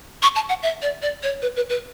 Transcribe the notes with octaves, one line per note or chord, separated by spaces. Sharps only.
C#6
A5
F#5
E5
D5
D5
C#5
B4
B4
B4